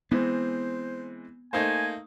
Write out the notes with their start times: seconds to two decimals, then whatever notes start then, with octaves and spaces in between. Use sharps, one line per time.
0.11 E3 G#3 B3 C4 C5
1.53 A3 A#3 D#4 C5 G#5